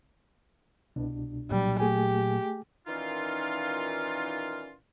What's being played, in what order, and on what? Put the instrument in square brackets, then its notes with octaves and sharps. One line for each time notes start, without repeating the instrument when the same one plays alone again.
[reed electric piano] C2 B2 D4
[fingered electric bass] A#2 F#3 [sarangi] G3
[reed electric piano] A3 G#4 G#5 [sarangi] G4
[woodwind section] A#2 D#3 E3 C#4 D#4 F4